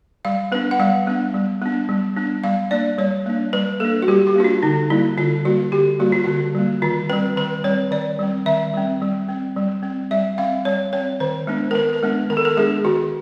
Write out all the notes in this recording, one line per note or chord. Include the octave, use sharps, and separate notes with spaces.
G3 F5
B3 D4 B4
F#5
G3 F5
B3 D4
G3
B3 D4
G3
B3 D4
G3 F5
A#3 D4 D5
G3 C#5
A#3 D4
G3 B4
A#3 D4 A4
F#4
G3 G4
G4
A#3 D4 F#4
F4
D3 D#4
G3 A#3 E4
D3 F4
G3 A#3 F#4
D3 G4
G3 A#3 F#4
F4
D3 F#4
G3 A#3
D#3 F4
G3 C4 B4
D#3 B4
G3 C4 C#5
D#3 D5
G3 C4
D#3 E5
G3 C4
G3
C4
G3
C4
G3 E5
C4 F5
G3 C#5
C4 C#5
D#3 C5
G#3 B3 D4
A#4
D#3 B4
A#4
G#3 B3 D4
D#3 A#4
A4
A#4
G#3 B3 D4 G#4
D#3 F#4